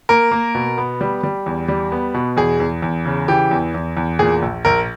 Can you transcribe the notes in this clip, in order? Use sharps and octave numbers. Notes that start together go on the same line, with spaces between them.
A#3 A#4
A#3
B2
B3
G3
G3
E2
G3
B3
B2
E2 G#4
E2
E2
C#3
E3 G4
E2
E2
E2
A#2 G#4
A#1
A#1 A#4